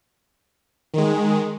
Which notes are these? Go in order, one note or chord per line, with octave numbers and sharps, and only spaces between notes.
D#3 G#3